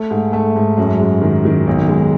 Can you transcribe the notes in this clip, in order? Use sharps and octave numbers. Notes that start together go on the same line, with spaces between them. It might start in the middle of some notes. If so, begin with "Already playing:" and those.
Already playing: A3
G#2
A3
G#2
F#2
G#3
D#3
D#3
B1
G#3